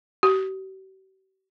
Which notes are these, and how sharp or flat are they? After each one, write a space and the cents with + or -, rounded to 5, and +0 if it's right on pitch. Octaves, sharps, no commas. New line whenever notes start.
G4 -45